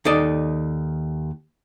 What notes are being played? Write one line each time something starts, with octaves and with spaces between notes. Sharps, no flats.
D#2 D#4 A4 D5 D#5